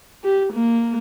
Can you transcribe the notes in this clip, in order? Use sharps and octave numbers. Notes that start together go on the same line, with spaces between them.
G4
A#3